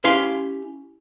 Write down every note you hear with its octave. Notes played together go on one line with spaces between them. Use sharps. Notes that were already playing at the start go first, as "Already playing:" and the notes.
C#4 E4 G4 F5 C6